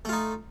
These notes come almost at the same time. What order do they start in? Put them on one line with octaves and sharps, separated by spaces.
A3 F4 D#4